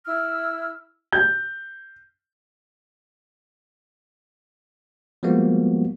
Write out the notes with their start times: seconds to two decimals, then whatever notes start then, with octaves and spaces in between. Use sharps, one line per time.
0.05 E4 E6 F6
1.13 G6
5.23 F3 G3 G#3 A#3 B3 F#4